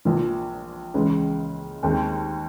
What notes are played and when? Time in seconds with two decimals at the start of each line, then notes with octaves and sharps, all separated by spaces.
0.05 A#1 A#2 F3
0.94 C#2 C#3 E3 G#3
1.83 D#2 D#3 G#3 C4